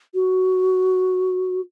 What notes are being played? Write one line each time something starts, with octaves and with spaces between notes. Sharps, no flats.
F#4